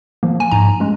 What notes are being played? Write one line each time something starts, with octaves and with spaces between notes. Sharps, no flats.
F3 A#3
G#5
G#2 A#5
G#3 C#4